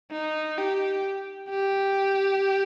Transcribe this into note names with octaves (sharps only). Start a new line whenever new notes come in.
D#4
G4
G4